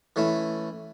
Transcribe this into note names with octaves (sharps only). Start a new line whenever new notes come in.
E3 A3 C#4 E4